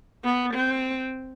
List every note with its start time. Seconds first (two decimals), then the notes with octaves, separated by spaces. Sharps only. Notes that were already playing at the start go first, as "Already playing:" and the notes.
0.24 B3
0.54 C4